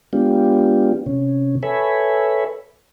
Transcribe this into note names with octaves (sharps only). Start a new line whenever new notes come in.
G#3 B3 D4 F4 G4
C3 C#4
A4 B4 C#5 E5 G#5 B5